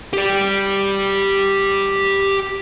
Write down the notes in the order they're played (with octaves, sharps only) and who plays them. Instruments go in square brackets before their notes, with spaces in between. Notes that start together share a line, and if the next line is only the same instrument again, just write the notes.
[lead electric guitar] G4 D5